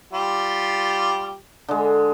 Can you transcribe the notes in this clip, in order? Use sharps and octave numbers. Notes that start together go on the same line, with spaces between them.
G3 F4 G4
D3 G#3